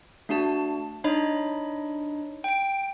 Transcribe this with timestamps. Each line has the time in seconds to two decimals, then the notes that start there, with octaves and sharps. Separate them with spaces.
0.29 A3 D4 F#4 A5
1.04 D4 D#4 C#5 D#5 B5
2.44 G5 D7